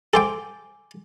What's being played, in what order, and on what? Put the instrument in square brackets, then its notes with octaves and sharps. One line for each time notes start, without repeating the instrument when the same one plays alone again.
[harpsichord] A4 C5 G5 [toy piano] G#5 D6